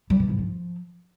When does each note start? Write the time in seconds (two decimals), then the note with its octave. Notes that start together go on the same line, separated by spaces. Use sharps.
0.10 G3
0.20 B2
0.29 G#2
0.39 F3